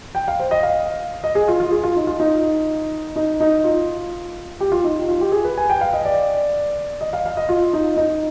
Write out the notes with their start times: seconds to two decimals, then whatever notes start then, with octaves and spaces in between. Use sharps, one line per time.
0.15 G5
0.28 F5
0.40 C5
0.51 D#5
0.63 F5
1.24 D#5
1.35 G#4
1.48 F4
1.60 F4
1.71 G#4
1.83 F4
1.96 D#4
2.07 F4
2.20 D#4
3.16 D#4
3.40 D#4
3.64 F4
4.60 G4
4.72 F4
4.84 D#4
5.08 F4
5.21 G4
5.32 G#4
5.44 B4
5.57 G#5
5.70 G5
5.81 F5
5.93 D#5
6.05 D5
7.01 D#5
7.13 F5
7.26 F5
7.37 D#5
7.49 F4
7.73 D#4
7.97 D#4